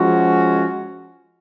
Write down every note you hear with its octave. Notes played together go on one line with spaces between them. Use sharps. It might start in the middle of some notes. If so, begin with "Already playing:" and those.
Already playing: F3 G#3 C#4 F#4